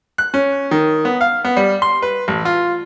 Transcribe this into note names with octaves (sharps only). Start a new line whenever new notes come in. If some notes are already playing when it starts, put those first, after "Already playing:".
F#6
C#4
D#3
B3
F5
B3
G3
C6
B4
A1
F4